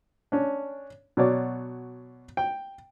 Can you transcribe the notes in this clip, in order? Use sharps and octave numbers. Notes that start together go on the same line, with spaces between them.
C#4 D4
B2 F#3 C#5 D5
G5